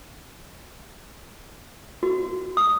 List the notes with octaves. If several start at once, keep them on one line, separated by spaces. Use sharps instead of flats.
F#4
D#6